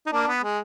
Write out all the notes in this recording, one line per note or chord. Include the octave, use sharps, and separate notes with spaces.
D#4
A#3 D4
B3
G#3